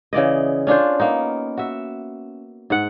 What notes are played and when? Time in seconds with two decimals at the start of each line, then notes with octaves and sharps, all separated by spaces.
0.13 C#3 E3 D5 D#5
0.67 C#4 D4 F4 C5
1.00 A#3 B3 D#4
1.57 F#4 E5
2.70 G#2 F#5